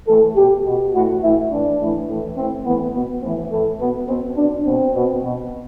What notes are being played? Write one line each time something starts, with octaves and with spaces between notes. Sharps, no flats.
A2 E3 A4
B2 G4
B2
A2 E3 F#4
A2 E3 E4
A2 E3 D4
A2 E3
A2 E3
A2 E3 C4
A2 E3 B3
B2 B3
A2 E3 C4
A2 E3 A3
B2 B3
B2 C4
B2 D4
B2 C4
B2
B2